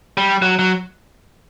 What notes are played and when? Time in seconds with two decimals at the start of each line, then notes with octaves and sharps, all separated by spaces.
0.18 G3
0.42 F#3
0.59 F#3